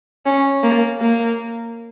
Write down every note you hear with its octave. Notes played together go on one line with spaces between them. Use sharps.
C#4
A#3
A#3